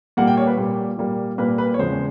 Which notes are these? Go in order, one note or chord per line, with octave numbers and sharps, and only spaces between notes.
A#2 G3 A#3 F#5
G5
C#5
B4
A#2 G3 A#3
A#2 G3 A#3
A#2 G3 A#3 B4
B4
C#5
E2 C#3 F3 G#3 C5